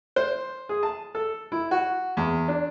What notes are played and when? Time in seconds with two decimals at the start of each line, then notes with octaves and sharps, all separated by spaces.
0.16 C5
0.69 G#4
0.83 A5
1.15 A4
1.52 E4
1.71 F#4
2.17 E2
2.48 D4